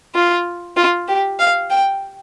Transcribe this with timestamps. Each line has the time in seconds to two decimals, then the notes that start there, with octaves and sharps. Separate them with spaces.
0.15 F4
0.77 F4
1.08 G4
1.39 F5
1.70 G5